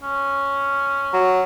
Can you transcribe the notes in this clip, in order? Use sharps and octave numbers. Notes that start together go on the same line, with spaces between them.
C#4
F#3